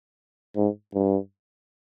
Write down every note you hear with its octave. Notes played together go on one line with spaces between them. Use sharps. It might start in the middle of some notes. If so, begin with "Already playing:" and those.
G#2
G2